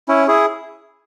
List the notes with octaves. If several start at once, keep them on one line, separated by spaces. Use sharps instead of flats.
C#4 E4
E4 G#4